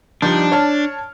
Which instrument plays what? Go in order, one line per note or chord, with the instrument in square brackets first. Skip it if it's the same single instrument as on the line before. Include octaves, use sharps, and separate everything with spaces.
[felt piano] F3 G3 D#4 [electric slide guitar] D4
[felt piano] C#5 A5 F6